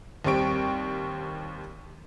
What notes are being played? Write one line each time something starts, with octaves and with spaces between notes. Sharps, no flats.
D#2 G3 C4 C#6 D7